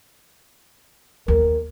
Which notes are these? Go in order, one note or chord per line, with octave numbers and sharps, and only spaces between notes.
D#2 A#4